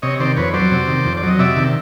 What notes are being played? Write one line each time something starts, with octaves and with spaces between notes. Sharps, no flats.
C3 C#5 D#5
D#3 C5 D5
F2 B4 C#5
F#3 C5 D5
C3
D#3
F2
D5
F#3 D#5
C3 D5 E5
D#3